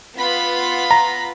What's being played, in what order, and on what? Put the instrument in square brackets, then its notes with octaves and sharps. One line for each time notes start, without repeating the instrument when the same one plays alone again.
[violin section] B3 F4 B5
[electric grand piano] A#5